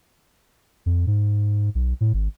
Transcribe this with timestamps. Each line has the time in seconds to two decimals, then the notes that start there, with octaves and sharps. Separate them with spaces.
0.86 F2
1.07 G#2
1.75 B1
2.01 A2
2.14 G#1